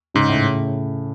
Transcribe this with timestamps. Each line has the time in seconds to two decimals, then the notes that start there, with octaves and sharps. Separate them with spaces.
0.14 G#2 C#3
0.29 A2